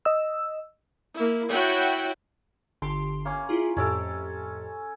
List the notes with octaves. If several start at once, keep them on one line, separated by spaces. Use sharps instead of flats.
D#5 E6
A#3 E4
E4 F#4 C#5 E5 F#5 G5
G1 D3 G4 C6
A#3 C#4
E4 F4 G#4
F2 A2 C#4 G4 A4